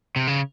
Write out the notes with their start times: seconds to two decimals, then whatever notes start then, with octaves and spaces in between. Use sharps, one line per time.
0.16 C3
0.27 C#3